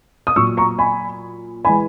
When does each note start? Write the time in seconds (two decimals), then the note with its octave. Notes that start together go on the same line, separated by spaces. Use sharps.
0.27 D#6
0.36 A#2 F#3 C#6 E6
0.57 A#5 C#6
0.79 G#5 B5
1.65 E3 G#3 G#5 B5